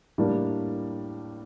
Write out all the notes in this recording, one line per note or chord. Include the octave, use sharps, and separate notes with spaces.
A2 G3 A#3 D4